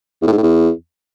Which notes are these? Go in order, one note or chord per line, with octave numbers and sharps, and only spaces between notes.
E2
A2
G#2
A2
E2